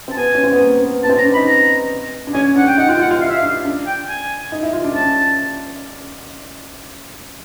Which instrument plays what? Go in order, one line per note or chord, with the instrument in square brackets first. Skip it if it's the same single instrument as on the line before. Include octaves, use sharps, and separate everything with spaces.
[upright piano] C4 [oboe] A5
[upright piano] B3 [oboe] G#5
[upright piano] C#4
C4
B3
A#3
B3
[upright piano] B3 [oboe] A5
[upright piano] C4
[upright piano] C#4 [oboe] A#5
[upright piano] D4
[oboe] B5
[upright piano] D#4
[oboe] A#5
[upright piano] D4
[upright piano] C#4 [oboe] G#5
[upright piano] D4 [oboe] F#5
[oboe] G5
[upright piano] D#4 [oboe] F#5
[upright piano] F4 [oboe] G5
[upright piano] F4 [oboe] F#5
[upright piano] F4
[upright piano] E4 [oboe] F5
[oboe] E5
F5
[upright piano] D4
D4
[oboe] G5
G#5
[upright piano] D#4
E4
F4
D4
[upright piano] C#4 [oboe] A5